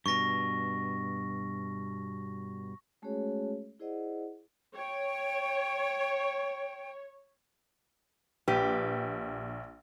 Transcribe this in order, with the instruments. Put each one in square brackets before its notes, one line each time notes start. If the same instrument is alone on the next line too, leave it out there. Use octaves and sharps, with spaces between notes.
[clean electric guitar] G2 B2 [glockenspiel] C#6 A#6
[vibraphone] G#3 A3 C#4 F#4 G#4 C#5
E4 G#4 C5 D5 D#5 F#5
[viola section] C#5 [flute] G5
[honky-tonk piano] A#1 [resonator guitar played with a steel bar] G4 B4